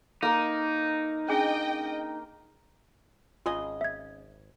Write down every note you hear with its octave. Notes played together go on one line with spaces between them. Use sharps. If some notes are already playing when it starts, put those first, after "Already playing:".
A#3 D#4 A#4
C#4 D4 G#4 D#5 G5
G#1 C#3 F4 G#4 D#5
E5 G#6